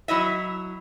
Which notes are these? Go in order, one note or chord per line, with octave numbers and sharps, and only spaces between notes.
F#3 E4 D#5 E5